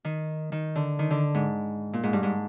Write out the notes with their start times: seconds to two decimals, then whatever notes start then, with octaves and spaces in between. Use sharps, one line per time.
0.05 D#3
0.52 D#3
0.76 D3
0.99 D#3
1.10 D3
1.35 G#2
1.93 A#2
2.03 G#2
2.13 G2
2.23 G#2